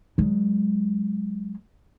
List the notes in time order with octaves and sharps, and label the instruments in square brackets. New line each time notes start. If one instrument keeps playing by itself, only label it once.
[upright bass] F#3 G#3